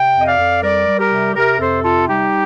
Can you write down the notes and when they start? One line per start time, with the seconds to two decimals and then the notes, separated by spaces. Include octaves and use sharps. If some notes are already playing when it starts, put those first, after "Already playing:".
Already playing: C3 G5
0.14 F2
0.21 D#5
0.26 D5 F5
0.38 F2
0.62 G3 A#4 D5
0.88 G3
1.00 G4 A#4
1.12 C3
1.36 C3 G4 A#4
1.59 F2 A4 C5
1.84 C3 F4 A4
2.08 G3 D#4 G4